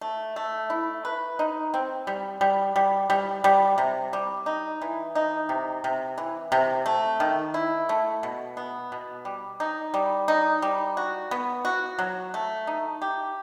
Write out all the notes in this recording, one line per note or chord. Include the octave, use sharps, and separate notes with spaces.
A3
A3
E4
B4
D#4
C4
G3
G3
G3
G3
G3
C3
G3
D#4
E3
D#4
C3
C3
E3
C3
A3
D#3
E4
A3
B2
B3
B2
G3
D#4
G3
D#4
G3
F#4
B3
F#4
F#3
A3
D#4
G4